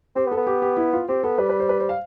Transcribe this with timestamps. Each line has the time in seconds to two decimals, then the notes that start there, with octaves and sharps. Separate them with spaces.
0.16 C4 G4
0.27 B3
0.32 A4
0.37 B3
0.47 G4
0.62 G4
0.77 E4
0.93 F4
1.08 C4 G4
1.24 B3 A4
1.38 G3 B4
1.49 B4
1.60 C5
1.69 B4
1.80 C5
1.89 F5